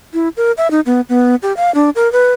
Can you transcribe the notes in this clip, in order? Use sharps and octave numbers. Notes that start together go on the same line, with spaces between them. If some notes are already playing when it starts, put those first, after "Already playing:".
E4
A#4
E5
D#4
B3
B3
G4
F5
D4
A#4
B4